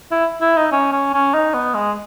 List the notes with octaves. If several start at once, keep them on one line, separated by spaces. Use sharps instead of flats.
E4
E4
D#4
C#4
C#4
C#4
D#4
B3
G#3